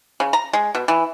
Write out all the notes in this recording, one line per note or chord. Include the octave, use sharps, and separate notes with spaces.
C#3
A#5
G#3
B2
E3